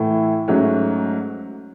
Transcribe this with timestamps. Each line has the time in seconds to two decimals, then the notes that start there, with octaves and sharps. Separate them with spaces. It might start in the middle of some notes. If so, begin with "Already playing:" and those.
Already playing: A2 E3 A3 E4
0.48 G#2 F#3 A3 C#4